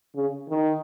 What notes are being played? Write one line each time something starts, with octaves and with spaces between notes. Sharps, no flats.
C#3
D#3